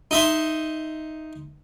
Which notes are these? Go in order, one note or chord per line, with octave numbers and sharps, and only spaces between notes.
D#4 E5 C6